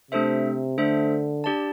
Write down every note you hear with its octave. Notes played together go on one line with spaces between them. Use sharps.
C3 A3 D4 A4 C5 E5
D3 A3 D4 A4 C5 E5
D4 G4 D5 A5